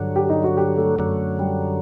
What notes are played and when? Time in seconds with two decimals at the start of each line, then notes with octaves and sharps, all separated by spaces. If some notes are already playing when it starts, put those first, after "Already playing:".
Already playing: G2 D3 F#3
0.16 G4
0.29 D#4
0.44 F#4
0.57 G4
0.77 A3
0.99 F#2 D3 F#3 A3
1.39 G3